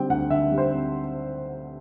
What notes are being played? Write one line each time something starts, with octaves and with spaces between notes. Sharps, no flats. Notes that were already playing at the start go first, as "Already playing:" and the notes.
Already playing: D3 G3 C4 G5
D2 F#5
D3 E5
G3
C5
C4